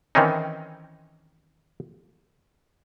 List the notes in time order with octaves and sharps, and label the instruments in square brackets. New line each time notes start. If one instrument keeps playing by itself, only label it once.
[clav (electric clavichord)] D#3 E3 C4 C#4 D#4